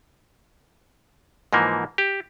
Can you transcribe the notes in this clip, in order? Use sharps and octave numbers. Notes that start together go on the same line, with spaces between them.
G#2 E3 F3 A#3
G4